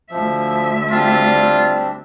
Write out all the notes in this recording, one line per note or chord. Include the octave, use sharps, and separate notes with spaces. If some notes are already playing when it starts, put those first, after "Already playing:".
D2 F3 E5
G3 C4 D4 F4